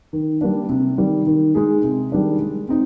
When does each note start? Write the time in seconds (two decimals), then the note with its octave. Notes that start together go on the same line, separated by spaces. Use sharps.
0.13 D#3
0.41 G3 A#3 D4
0.69 C3
0.98 D#3 G3
1.27 D#3
1.55 G#3 D#4 G#4
1.83 C3
2.12 D#3 G3 D4
2.40 G#3
2.69 C4 D#4